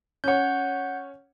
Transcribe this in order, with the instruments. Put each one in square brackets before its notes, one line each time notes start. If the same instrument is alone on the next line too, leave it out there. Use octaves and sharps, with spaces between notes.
[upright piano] C#4 C#5 [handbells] F#5 G6